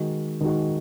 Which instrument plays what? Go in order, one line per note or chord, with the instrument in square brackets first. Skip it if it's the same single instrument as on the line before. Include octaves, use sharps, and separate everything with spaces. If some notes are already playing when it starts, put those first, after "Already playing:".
Already playing: [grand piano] D#3 G#3 D#4 F#4
D#3 G#3 D#4 F#4